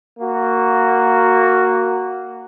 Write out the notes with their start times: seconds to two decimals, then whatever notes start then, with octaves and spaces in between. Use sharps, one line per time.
0.19 A#3 F#4